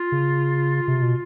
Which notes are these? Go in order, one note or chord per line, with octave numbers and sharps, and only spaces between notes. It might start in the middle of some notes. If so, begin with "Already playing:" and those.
Already playing: F4
C#3
C3
B2